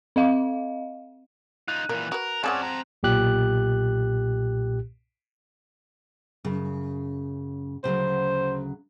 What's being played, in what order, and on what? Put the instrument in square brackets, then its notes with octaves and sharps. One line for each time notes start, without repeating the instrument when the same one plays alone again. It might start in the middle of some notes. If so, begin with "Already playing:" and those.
[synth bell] C4 D#5 F5
[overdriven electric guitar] D#4 F4 [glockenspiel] F#6
[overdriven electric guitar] A#2 E3 [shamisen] A#4
[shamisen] F#4 B4 [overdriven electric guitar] A#4
[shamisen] G#3 G#4 F#5 [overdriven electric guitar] C4 A5 [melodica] C#4 D5
[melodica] A#5
[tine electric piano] B1 A#2 G4 F#6
[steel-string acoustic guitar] F#2 C#3
[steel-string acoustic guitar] D2 C#3 F#3 [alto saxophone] C5